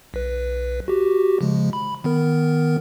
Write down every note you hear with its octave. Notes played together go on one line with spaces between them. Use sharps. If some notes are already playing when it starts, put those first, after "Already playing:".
B1 B4
F#4 G4
C#3 F3 G#3
B5
D#3 B3 A#4